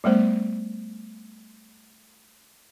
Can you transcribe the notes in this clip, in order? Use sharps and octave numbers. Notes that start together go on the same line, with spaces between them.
G3 A3 B3 C5